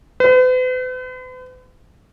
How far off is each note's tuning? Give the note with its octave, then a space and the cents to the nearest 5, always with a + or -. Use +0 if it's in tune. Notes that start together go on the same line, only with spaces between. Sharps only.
B4 +45